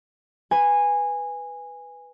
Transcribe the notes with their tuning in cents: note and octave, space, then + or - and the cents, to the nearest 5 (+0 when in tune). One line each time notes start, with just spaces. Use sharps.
B4 +0 G#5 -15